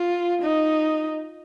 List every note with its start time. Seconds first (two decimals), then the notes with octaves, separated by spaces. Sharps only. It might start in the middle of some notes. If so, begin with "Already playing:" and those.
Already playing: F4
0.42 D#4